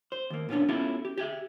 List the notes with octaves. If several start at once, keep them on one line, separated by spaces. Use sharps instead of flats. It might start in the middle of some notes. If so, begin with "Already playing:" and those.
C5
D#2 A#3
A#2 B3 C#4 D4
B3 C#4 E4 F4 G4 A4
G4
G4 G#4 E5